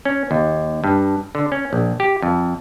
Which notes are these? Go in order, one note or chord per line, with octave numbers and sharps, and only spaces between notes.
C#4
D#2
G2
D3
C#4
A#1
G4
F2